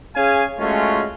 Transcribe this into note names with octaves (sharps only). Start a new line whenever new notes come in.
C#4 G#4 F5 G#5
G#3 A3 C#4 F4 F#4